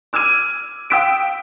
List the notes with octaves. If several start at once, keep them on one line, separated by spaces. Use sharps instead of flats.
D6 E6 F6 G#6 D#7
F5 G5 D#6 E6 B6 D7